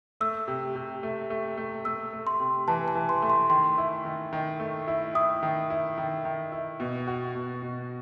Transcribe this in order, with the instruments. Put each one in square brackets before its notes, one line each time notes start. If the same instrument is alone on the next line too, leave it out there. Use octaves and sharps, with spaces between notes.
[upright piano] A3 [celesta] E6
[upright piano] C3
C3
A3
A3
A3
[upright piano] A3 [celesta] E6
[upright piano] A3
[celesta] C6
[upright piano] C3
[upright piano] E3 [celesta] A5
[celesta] A5
[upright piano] E3
[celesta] C6
[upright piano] A3
[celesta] C6
[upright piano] D#3 [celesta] C6
[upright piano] E4
D#3
D#3
A3
E4
[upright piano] E4 [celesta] D#6
[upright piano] D#3
E4
D#3
D#3
E4
B2
F#4
B2
B2